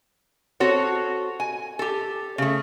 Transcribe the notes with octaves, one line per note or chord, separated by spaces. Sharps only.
C4 F#4 A4 C#5
G#5
G4 A4
C#3 A3